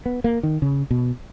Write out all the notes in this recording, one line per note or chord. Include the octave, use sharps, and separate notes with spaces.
B3
A#3
D#3
C#3
B2